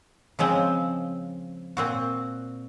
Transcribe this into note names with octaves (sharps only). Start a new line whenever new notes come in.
C#3 F3 G#3 C4
A#2 C4 F#4